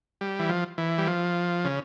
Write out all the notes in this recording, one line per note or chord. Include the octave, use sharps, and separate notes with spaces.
G3
E3
F3
E3
G3
F3
C#3